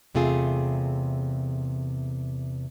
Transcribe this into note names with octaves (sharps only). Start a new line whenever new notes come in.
E2 C3 A3 F4 G#4